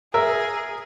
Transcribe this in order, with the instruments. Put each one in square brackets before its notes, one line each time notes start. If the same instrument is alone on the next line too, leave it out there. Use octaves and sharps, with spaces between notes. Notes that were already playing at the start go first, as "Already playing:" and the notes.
[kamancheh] G#4 [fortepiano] A#4 E5